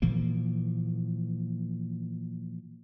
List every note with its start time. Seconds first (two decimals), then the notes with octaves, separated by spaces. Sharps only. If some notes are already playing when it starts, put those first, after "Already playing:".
0.02 A#2 E3 F3 A#3